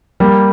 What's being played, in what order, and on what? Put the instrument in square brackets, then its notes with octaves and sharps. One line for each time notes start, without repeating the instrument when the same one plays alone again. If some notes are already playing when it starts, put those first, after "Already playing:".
[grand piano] G3 A#3